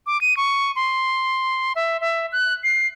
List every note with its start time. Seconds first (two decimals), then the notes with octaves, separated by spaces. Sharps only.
0.06 D6
0.21 D#7
0.37 C#6
0.76 C6
1.76 E5
2.01 E5
2.32 F#6
2.64 C7